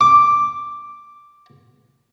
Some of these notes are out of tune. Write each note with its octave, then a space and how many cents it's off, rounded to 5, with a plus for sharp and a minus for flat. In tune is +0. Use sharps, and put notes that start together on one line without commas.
D6 +0